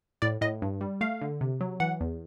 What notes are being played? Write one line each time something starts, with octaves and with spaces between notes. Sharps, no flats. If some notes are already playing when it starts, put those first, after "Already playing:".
A2 D5
A2 D#5
G2
G3
A3 F5
D3
C3
F#3
E3 F#5
E2